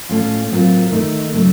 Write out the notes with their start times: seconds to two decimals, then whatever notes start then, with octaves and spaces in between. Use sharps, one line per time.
0.09 A2 A3 C#4 F4
0.51 A2 F#3 C4 F4 A#4
0.92 D#3 A3 D#4
1.34 C#3 F#3 A3